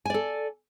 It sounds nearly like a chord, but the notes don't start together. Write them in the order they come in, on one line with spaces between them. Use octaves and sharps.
G#5 D5 A4